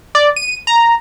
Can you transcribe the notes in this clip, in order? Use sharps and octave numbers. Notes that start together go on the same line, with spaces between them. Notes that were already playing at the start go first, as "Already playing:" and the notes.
D5
D#7
A#5